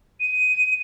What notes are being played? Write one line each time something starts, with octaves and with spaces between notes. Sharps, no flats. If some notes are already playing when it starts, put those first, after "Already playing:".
D#7